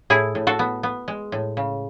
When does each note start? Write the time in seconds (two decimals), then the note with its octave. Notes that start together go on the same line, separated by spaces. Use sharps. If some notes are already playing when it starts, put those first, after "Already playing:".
0.10 A2 E4 G#4
0.35 A2
0.47 F#4 A4
0.59 B3
0.83 B3
1.08 G#3
1.32 A2
1.57 C#3